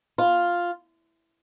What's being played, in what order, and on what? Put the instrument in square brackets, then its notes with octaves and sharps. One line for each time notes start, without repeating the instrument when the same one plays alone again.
[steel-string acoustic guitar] F4